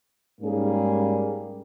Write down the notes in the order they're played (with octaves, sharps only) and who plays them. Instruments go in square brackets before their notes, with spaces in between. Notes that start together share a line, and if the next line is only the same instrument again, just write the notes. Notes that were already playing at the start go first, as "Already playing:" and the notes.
[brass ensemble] G#2 G3 A#3 C#4 G#4